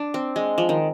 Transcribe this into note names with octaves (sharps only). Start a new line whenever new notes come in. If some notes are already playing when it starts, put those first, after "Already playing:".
Already playing: D4
C4
G#3
F3
D#3